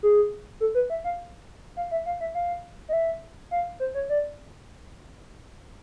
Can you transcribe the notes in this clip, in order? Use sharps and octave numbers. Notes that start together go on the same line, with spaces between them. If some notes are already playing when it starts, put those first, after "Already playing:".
G#4
A4
B4
E5
F5
F5
E5
F5
E5
F5
D#5
E5
F5
C5
C#5
D5